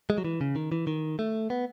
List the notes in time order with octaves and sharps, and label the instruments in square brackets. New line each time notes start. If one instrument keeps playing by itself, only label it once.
[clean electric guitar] G#3
F#3
E3
C#3
D#3
E3
D#3
A3
B3